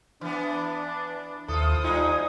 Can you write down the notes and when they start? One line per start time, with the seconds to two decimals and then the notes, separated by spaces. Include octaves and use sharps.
0.21 E3 B3 D4
1.48 D#2 E4 F4 A4 C5 D#6
1.84 G3 D#4 F4 G#5